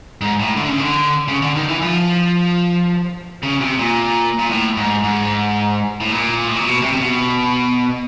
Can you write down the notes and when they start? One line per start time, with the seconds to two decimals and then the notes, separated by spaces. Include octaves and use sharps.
0.21 G#2
0.39 A2
0.56 D3
0.68 C#3
0.80 D3
1.28 C#3
1.42 D3
1.56 D#3
1.68 E3
1.82 F3
3.43 C#3
3.61 C3
3.79 A#2
4.39 A#2
4.50 A2
4.77 G#2
5.04 G#2
6.00 A2
6.11 A#2
6.48 A2
6.56 A#2
6.64 B2
6.82 C3
6.93 C3
7.00 B2